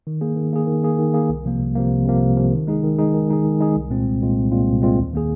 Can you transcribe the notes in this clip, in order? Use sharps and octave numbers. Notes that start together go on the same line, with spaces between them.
D#3
A#3 G#4
D#3
A#3 G#4
D#3
A#3 G#4
D#3
A#3 G#4
C2
C3 F3 A#3
C2
C3 F3 A#3
C2
C3 F3 A#3
C2
C3 F3 A#3
D#3
G#3 D#4 G#4
D#3
G#3 D#4 G#4
D#3
G#3 D#4 G#4
D#3
G#3 D#4 G#4
C2
A#2 G#3 C4 F4
C2
A#2 G#3 C4 F4
C2
A#2 G#3 C4 F4
C2
A#2 G#3 C4 F4
D#2
D#3 A#3 G#4